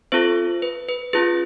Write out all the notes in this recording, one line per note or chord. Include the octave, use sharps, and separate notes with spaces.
C4 F4 A4 C5
B4
B4
C#4 F4 G#4 B4